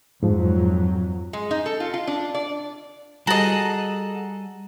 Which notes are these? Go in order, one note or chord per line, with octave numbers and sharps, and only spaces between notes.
F2 G#2 F3 F#3
G#3
D#4
A4
F4
F4
D4
D5
G3 F#4 G#4 A4 D#5 A#5 A6 F#7